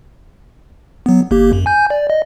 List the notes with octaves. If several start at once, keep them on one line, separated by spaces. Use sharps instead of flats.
F#3 B3
G1 A#3 G4
F#2
G#5 G6
D5
D#5